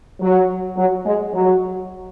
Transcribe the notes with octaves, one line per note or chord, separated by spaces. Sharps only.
F#3
F#3
G#3
F#3